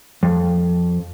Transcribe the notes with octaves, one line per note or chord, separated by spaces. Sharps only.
F2